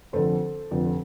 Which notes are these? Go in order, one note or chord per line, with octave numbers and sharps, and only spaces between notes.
F1 F2 D3 F3 A4 C5
F1 F2 D3 F3